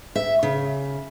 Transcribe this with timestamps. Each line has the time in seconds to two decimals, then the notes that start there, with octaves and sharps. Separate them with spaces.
0.15 E5
0.43 C#3